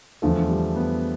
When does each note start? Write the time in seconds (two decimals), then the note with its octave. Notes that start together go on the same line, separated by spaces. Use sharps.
0.22 E2 D3 F3 A3
0.49 G3
0.76 B3